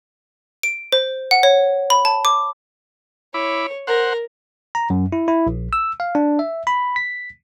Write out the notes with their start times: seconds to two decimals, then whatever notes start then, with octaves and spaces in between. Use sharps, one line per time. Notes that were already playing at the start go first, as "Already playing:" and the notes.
0.63 D7
0.92 C5
1.31 F#5
1.43 C#5
1.90 B5
2.05 A5
2.25 D6
3.34 E4 C#5 B5 D6
3.87 A#4 C5 F#5
4.75 A#5
4.90 F#2
5.12 E4
5.28 E4
5.47 A#1
5.73 E6
6.00 F5
6.15 D4
6.39 E5
6.67 B5
6.96 B6